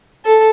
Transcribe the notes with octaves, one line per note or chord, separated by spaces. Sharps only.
A4